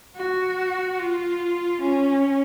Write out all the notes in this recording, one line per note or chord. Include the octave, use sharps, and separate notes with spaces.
F#4
F4
C#4